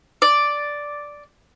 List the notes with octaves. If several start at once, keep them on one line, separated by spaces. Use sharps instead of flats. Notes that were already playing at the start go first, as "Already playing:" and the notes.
D5